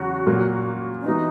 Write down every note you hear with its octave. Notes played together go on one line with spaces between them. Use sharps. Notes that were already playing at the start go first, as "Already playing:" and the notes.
Already playing: E2 C#3 F#3 C#4 F#4
A#2 F#3 A#3
C#4
E3 B3 D#4 F#4 B4